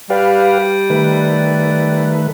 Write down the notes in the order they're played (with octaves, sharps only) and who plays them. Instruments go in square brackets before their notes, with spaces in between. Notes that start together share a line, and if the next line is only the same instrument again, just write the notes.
[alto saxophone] G3 [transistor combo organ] G4 B4 F5
[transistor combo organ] D#3 A3 B4